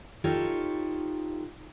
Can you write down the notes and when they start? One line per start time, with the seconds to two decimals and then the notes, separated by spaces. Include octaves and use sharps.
0.24 D#4 F4 G4 A4 C#5